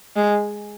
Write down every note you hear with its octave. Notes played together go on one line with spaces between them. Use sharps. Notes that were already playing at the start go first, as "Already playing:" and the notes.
G#3